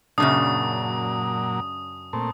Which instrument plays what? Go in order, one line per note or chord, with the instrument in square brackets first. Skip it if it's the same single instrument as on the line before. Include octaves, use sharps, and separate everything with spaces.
[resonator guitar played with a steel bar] F#2 C#3 D4 [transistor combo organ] A#2 F#3 [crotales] D#6
[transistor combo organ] A#2 A3 C4